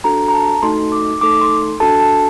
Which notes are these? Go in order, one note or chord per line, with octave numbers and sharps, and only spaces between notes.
D4 F#4 A4 A#5
A#5
A5
A3 D#4 F#4 A4 C6
D6
A3 D#4 A4 D6
C6
D4 F#4 A4 A5
A5